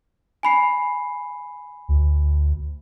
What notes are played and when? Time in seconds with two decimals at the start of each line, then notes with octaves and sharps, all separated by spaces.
0.43 G#5 B5 C7
1.89 D2